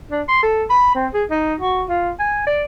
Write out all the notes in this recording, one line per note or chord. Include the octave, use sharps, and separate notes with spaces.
D4
C6
A4
B5
C4
G#4
D#4
F#4
F4
G#5
D5